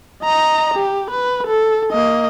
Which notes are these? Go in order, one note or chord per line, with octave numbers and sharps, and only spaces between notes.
D#5 A#5
G4
B4
A4
A#3 D#5